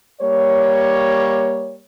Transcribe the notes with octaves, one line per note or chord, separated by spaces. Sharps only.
G3 A#3 C#5